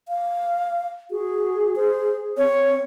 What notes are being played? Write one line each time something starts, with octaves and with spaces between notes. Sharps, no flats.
F5
F#4 G#4
C5
C4 C#5